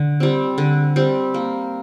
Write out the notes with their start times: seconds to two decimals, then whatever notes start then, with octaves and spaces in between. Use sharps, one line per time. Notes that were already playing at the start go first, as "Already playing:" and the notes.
Already playing: D3
0.20 G3 C4
0.58 D3
0.96 G3 C4
1.34 A#3